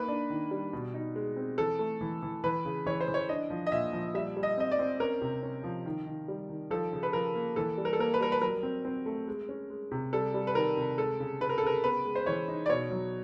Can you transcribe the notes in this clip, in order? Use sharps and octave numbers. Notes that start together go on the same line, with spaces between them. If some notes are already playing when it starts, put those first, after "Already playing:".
Already playing: A#3 D#4 B4
D4
D#3
G3
B2
D#4
G#3
C4
E3 A4
A3
E3
E3
E3 B4
C#3
E3 C#5
C5
E3
C#5
D4 D#5
F3
D#5
A#2 E5
F3
G3 E5
G3
D#5
C4 D#5
D5
C4
C#4 A#4
C3
C#4
F3
D#3
D#3
G3
D#3
F3 A4
C#3
B4
F3 A#4
A#3
E3 A4
G3
A#4
A4
A#3 A#4
B4
G3 A#4
B4
F#3 A#4
C4
C4
A3
G#3
C#4
G#3
C3
G3 A4
G3
B4
D#3 A#4
C3
G#3 A4
C#3
C#3 B4
A#4
A4
C#3 A#4
B3 B4
G#3
C5
E3 C#5
D#4
D5
B2 C#5
F#3